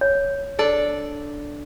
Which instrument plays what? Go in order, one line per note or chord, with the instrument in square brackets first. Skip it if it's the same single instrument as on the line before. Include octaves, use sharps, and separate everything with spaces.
[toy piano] C#5
[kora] D4 A4 D5